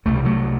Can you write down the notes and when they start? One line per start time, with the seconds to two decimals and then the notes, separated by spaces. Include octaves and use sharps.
0.05 C2 B2 A3
0.16 G3
0.25 F#3 A3